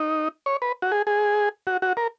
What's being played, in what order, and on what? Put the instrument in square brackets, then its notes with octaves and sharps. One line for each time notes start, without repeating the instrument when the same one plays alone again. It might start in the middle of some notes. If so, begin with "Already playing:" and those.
Already playing: [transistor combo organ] D#4
C#5
B4
F#4
G#4
G#4
F#4
F#4
A#4